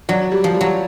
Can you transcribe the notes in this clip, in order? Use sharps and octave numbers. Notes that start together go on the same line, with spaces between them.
F#3 D4
G3
F3
G3
F#3